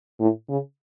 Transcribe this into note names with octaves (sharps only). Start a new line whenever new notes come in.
A2
C#3